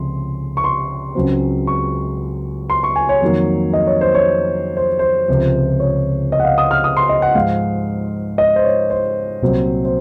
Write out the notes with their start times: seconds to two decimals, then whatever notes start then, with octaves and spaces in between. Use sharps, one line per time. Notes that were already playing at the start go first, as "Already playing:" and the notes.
Already playing: C#2 C3 F3 C6
0.57 C#6
0.64 C6
1.15 C#2 C#3 F#3 C4
1.67 C#6
2.70 C6
2.83 C#6
2.96 G#5
3.09 C#5
3.22 F2 D#3 F#3 A#3
3.73 D#5
3.87 C#5
4.01 C5
4.15 C#5
4.77 C5
4.99 C5
5.28 C#2 C3 F3
5.80 C#5
6.32 D#5
6.40 F#5
6.44 F5
6.58 D#6
6.71 F6
6.84 D#6
6.97 C6
7.09 D#5
7.22 F#5
7.35 G#2 F3 G#3 F5
8.38 D#5
8.56 C5
8.64 C#5
8.90 C5
9.42 C2 A#2 F#3 C4
9.85 C5